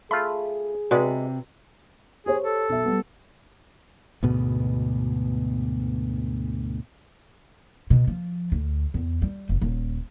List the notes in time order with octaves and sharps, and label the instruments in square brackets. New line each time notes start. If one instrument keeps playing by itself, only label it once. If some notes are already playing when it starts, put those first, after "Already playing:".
[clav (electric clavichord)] A3 F4 [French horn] G#4 [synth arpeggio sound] B5
[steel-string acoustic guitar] C3 [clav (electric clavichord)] G#3 [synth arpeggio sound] F#4 B4 D5
[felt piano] G4 C5 C#5 [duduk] G#4
[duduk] A4
[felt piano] B1 E5
G3 B3
[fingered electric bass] D2 G#2 B2 B3
[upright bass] B2
F3
D2
E2
G3
F1
D#1